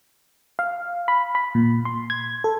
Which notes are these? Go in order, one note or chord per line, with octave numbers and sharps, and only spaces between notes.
F5
B5
B5
A#2
C6
G#6
A4